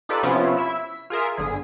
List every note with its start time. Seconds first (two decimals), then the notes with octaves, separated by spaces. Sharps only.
0.09 D#4 F4 G4 A4 B4 D5
0.23 C3 F3 B3 C#4 E4 F4
0.57 E4 E5
0.80 B6
1.10 F4 G#4 A#4 E5
1.37 G1 D3 G#4 B6